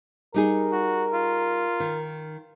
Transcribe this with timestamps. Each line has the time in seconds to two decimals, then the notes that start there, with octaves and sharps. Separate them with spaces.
0.34 G3 D#4 G#4 A#4
0.72 F#4
1.13 F4
1.80 D#3